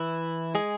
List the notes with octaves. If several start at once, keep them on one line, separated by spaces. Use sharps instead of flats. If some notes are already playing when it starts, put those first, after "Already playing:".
Already playing: E3 E4
G#3 G#4